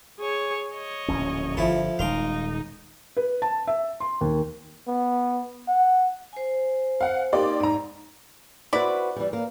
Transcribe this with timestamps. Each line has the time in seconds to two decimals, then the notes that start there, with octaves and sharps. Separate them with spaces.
0.20 G#4 C#5
0.74 C#5 D#5
1.08 D1 A#1 C#4
1.57 G1 F3 E4 A4
1.99 D#1 G#3 D#4 F5 C6 D6
3.17 B4
3.42 A5
3.67 E5
4.00 C6
4.21 D#2
4.87 B3
5.68 F#5
6.33 C5 G#5
7.01 F5 F#5
7.33 A#3 D#4 G4 D5 D#5 C6
7.60 G#2 D5 A#5
8.73 C4 E4 F#4 B4 D5
9.16 E3 G3
9.33 A#3